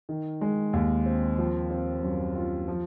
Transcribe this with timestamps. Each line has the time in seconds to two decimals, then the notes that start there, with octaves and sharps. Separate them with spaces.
0.09 D#3
0.41 G#3
0.73 D#2
1.06 C4
1.38 F3
1.70 C4
2.02 F#2
2.35 F4
2.68 F3